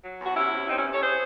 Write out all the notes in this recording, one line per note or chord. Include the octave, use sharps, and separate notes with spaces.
F#3
E2
F#4
C3 C#4 E4
C3
E2 C4 D#4
C#4 E4
C3
A4 C#5
G#4 C5